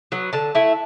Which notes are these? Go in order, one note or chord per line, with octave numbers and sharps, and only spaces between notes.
F#3 B3
D3 A5
A3 E4